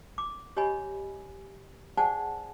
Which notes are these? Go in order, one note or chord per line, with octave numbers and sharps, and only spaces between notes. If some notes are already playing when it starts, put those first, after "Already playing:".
D6
G4 C#5 D#5 G#5 B5
G#4 C5 D5 F#5 G#5 A5